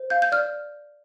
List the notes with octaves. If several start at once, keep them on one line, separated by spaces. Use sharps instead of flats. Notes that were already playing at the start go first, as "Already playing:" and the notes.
Already playing: C5
F5 G6
G6
D5 F6